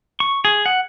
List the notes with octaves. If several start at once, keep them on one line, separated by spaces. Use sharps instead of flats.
C#6
G#4
F#5